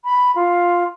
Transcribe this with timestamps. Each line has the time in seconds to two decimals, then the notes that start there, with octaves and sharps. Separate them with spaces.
0.04 B5
0.35 F4